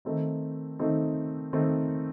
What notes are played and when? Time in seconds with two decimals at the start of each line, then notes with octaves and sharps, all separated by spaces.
0.05 D#3 A3 C4 D#4
0.79 D#3 A3 C4 D#4
1.53 D#3 A3 C4 D#4